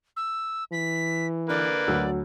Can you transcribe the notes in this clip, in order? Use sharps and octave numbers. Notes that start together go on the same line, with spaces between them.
E6
E3 B6
D3 A#3 B4 D5
D2 F#3 F#5 E6